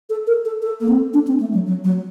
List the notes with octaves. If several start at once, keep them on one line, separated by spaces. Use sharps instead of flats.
A4
A#4
A4
A4
A#3
C4
D4
C4
A3
F#3
F#3
F#3